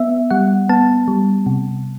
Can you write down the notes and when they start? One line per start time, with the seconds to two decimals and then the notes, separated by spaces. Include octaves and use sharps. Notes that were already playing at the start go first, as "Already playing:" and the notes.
Already playing: B3 E5
0.30 G3 F#5
0.69 B3 A5
1.08 G3
1.46 C3